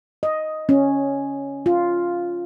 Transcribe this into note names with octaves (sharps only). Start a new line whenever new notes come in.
D#5
C#4
F4